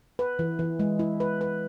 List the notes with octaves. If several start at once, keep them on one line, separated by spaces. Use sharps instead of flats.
B4
E3
E3
G#3
E4
B4
B4